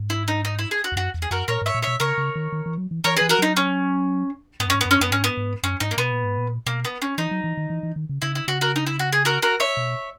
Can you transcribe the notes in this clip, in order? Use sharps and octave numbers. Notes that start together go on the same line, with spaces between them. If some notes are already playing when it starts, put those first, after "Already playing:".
Already playing: G#2
E4
D#4
D#4
E4
G#4
F#4
E2
F#2 F#4
E2
G#4
F#2 F#4 A#4
A#2 A#4 C#5
G#2
C#5 E5
A#2
B2 C#5 E5
C#3 A#4 C#5
C#3
D#3
D#3
E3
F#3
E3
E3 A#4 C#5
G#4 B4
E3
F#4 A#4
F#3 D#4
C#4
G#2 B3
F#2
G#2 C#4
B3
F#2
C#4
F#2 B3
G#2 C#4
B3
G#2
F#2 C#4
G#2 D#4
A#3
B2 B3
A#2
G#2
A#2
B2 A#3
B3
C#4
E3 D#4
F#3
E3
D#3
E3
E3
D#3
C#3
C#3 E4
E4
C#3 F#4
F#4 A#4
D#4
E4
F#4
G#4
F#4 A#4
F#4 A#4
C#5 E5
B2